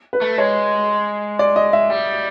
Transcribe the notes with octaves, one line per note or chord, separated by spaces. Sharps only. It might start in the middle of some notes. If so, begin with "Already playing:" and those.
B4
A3
G#3 C#5
D5
D#5
E5
G3